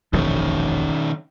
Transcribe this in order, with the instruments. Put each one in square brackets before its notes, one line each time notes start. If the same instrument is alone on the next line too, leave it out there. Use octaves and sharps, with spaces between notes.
[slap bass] E1 A#1 F#2 [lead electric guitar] D#3 C#4